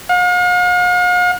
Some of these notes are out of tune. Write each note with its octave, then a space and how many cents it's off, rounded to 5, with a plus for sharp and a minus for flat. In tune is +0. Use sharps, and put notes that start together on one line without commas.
F5 +45